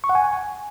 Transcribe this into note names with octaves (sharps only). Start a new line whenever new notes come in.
C#6
F#5
G#5